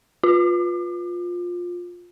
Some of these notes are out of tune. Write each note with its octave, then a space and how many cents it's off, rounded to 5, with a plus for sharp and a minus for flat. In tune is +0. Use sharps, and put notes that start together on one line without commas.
F4 +15